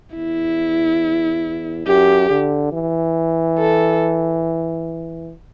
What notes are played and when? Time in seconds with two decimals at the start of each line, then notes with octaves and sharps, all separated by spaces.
0.15 E2 E4
1.86 F#2 G4
2.30 D3
2.72 E3
3.58 A4